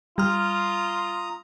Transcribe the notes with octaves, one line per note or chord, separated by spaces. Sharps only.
G3 F4 A#5 D#6 F6